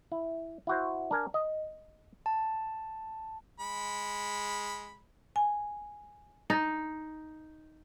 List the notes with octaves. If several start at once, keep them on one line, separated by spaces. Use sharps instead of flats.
E4
E4 F#4 C5
D4 A#4 G#5
D#5
A5
G#3 B5
G#5
D#4